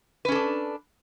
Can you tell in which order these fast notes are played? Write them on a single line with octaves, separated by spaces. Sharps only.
B4 C#4 A4 D4